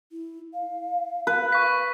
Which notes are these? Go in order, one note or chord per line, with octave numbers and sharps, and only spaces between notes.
E4
F5
B4
C#6 B6